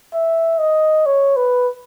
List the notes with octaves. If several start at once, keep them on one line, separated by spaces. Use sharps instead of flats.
E5
D#5
C#5
B4